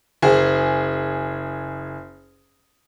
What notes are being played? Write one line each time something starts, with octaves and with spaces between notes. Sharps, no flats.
F#1 G#4